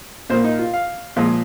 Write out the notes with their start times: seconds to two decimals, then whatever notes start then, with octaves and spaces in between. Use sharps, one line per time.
0.29 A#2 A#3 C5
0.44 D#4
0.59 F4
0.73 F5
1.16 A#2 F3 G#3